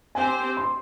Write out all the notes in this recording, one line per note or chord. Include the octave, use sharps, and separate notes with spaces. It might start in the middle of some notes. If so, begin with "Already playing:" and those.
C4 G4 C5 G#5
C6